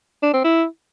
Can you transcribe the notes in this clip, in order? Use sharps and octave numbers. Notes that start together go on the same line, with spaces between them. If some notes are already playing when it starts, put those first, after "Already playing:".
D4
C4
E4